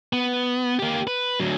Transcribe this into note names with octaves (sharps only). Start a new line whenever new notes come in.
B3
A#3 G4
B4
D2 F#3